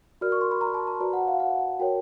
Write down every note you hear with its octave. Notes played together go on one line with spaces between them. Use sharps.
F#4 A#4 D5 F6
C#6
C6
B5
A#5
A5
A#5
F#4 B4 D5 A5
F#5
F5
F#5
F#4 A#4 C#5 G5